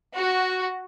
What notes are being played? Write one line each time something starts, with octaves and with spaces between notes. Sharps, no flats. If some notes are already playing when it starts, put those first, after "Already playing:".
F#4